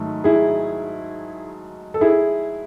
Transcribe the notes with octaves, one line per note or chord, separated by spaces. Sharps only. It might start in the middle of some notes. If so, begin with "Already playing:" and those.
Already playing: G#2 D#3 F#3 A3
E4 G#4
A4
E4 G#4